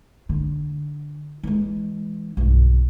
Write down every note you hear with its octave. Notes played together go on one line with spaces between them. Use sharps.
D3
E3 G#3
B1 G2